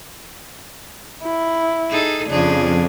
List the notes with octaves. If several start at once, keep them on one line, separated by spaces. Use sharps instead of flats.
E4
D#4 G#4 A4
F2 C#3 F3 D4 G#4